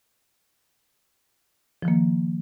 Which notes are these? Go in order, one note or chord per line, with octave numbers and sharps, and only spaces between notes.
D#3 F3 A#3